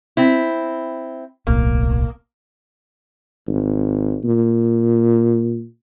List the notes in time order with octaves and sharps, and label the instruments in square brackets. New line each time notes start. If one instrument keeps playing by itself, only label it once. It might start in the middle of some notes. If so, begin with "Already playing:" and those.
[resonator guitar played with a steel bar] C4 E4
[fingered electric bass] D1 B1 A2 [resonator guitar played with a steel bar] A#3
[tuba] G#1
A#2